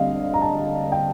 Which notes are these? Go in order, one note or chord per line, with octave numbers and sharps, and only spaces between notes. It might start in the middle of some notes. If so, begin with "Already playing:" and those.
Already playing: D3 G3 C4 D#5 F5
A#5
A5
G5